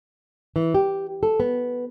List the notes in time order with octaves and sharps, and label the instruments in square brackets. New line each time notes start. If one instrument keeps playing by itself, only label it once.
[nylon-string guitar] E3
G4
A4
B3